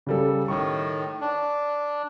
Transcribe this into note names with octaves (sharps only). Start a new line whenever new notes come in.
C#3 G3 A4
A2 D#3 C#6
D4